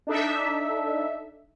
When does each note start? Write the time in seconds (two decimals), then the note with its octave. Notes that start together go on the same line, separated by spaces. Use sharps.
0.07 D4 D#4 A4 E5